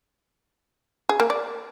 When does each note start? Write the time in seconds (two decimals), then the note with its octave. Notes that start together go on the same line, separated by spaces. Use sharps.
1.09 G#4
1.20 A#3
1.30 D5